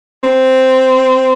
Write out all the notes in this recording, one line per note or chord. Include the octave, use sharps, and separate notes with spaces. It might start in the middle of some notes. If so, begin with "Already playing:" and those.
C4